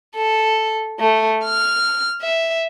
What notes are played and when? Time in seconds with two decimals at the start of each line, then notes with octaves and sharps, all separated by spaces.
0.15 A4
1.00 A3
1.45 F6
2.22 E5